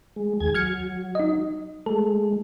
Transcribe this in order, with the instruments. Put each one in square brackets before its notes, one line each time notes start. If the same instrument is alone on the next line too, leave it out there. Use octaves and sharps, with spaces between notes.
[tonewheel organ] G#3
D#2 G#4 G#6
[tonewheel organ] F#3 [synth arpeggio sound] F6 G#6 C#7
[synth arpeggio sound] D#4 D#5
[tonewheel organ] G#3 A3 [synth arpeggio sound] A4